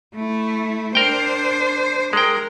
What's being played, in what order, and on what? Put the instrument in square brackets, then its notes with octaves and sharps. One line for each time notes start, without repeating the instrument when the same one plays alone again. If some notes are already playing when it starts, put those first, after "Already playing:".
[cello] A3 E4
[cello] D4 C5 [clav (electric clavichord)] A#4 G5
[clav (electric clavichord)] G#3 G5 [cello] A#4